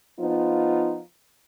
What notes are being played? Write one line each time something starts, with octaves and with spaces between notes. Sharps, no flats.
F3 B3 D#4 F4